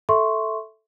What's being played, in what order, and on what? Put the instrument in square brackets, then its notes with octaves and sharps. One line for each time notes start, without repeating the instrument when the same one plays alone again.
[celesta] A4 E5 C6 C#6